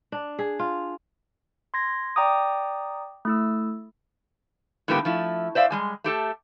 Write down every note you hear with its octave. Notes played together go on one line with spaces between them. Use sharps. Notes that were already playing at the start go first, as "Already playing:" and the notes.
D4
G#4
F4
C6 G#6 A#6
D5 G5 A#5 D6 D#6
A3 E4 E6
A2 D3 G3 A#3 B3 G4
F3 A3 E4
C5 D5 E5 F5
G3 G#3 G#5
A3 G4 A4